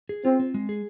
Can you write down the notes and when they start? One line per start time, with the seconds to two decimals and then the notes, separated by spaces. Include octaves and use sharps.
0.09 G#4
0.25 C4 F4
0.40 C4
0.54 G#3
0.69 G#4